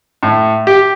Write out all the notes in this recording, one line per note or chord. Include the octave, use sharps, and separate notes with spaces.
A2
G4